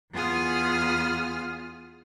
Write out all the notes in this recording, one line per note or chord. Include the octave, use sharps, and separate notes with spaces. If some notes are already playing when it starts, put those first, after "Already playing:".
E2 B3 F4 G#4 D#6 F6